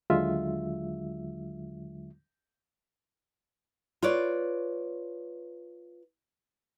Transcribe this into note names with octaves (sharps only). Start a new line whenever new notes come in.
D#2 D3 F#3 G#3 F4 E5
F4 B4 C#5 D5